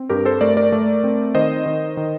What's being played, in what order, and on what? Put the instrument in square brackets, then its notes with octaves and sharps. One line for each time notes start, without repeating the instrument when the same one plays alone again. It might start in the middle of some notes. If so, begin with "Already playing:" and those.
Already playing: [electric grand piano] C4
G2 G4 A#4
A4 C5
A3 A#4 D5
A#4 D5
A3
C4
D#3 C5 D#5
D#3
D#3